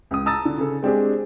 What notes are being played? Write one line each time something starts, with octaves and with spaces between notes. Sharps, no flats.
C#2 D#6
A5 A#5 D#6 E6 A6
D3
C#3 A4
G#3 C4 D4 G4 G#4